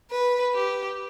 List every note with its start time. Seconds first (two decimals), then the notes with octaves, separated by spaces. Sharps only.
0.11 B4
0.55 G4